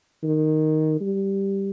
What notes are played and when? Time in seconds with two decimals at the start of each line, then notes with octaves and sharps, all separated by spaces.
0.23 D#3
1.01 G3